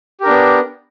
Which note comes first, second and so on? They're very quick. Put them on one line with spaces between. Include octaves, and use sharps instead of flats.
G4 A#4 D4 B3